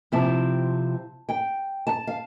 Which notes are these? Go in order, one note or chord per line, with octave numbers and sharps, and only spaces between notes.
C3 F3 C4 E4 A5
G5
A5
F5